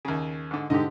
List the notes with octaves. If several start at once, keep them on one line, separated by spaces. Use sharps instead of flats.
D#2 C#3
G#2 D3
G#2 D3 G4 D#5